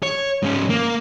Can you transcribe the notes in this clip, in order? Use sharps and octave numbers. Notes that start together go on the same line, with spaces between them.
C#5
G#2 C#4
A#3